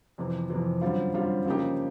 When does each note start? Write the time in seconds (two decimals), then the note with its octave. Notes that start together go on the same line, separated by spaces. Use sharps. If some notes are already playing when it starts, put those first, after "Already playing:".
0.18 F2 C3 E3
0.50 F2 C3 E3
0.81 F#2 D3 G3 C4 F4
1.14 F#2 D3 G3 C4 F4
1.46 C#3 F3 A#3 D#4 G4